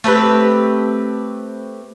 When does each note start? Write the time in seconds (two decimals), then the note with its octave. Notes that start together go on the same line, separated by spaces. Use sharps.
0.04 A3 C4 G4 B4